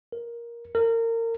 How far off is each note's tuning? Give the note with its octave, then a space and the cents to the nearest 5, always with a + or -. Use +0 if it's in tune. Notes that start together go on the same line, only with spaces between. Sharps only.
A#4 +10
A#4 -30